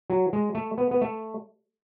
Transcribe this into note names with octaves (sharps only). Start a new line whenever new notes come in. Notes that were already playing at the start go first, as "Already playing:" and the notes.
F#3
G#3
A3
B3
B3
A3